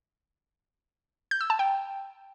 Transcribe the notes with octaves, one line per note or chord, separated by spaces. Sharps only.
G6
E6
A5
G5